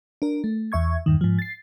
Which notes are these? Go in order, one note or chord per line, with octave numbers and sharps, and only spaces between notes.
D4 A#4
A3
E2 E5 C#6 G#6
E2 G2 D#3
G#2 F3
A6 C7